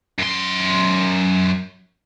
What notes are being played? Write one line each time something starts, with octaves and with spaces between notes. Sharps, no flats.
F#2 C6